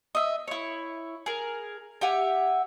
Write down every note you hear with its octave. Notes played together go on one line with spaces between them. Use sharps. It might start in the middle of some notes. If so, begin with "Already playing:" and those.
D#5 E5
E4 C#5
G#4 A#4
G4 E5 F#5 G#5